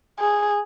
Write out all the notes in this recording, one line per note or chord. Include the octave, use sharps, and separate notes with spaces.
G#4